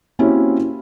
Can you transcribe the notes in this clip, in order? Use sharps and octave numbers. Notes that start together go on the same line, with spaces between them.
A#3 C4 C#4 E4 F#4 G4